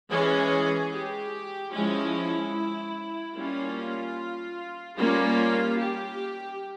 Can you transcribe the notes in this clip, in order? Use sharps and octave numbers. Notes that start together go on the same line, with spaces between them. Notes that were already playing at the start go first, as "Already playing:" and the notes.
E3 G#3 C#4 G#4
G4
F3 G#3 C#4 E4
G3 A#3 C#4 F4
G3 A#3 C#4 F4
G4